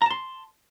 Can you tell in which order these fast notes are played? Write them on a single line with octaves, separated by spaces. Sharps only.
A#5 A5 C6